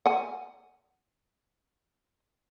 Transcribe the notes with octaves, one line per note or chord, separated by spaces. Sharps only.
F#5 G#5